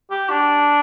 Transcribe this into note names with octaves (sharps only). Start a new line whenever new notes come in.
G4
D4